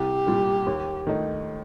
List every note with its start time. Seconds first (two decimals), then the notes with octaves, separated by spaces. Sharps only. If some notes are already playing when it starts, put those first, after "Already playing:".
Already playing: C2 G4
0.27 A#2 G3
0.66 D#2
1.07 D#3 A3 D#4